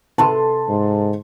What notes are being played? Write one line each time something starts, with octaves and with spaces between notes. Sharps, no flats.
C3 A4 B4 A5 C6
G#2